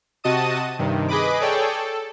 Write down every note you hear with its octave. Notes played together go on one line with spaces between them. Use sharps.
C3 F#4 D#5 A5 D#6 D#7
G2 C3 D#3
G#4 B4 D#5 B5 D6
G#4 A4 C#5 D5 G5
A4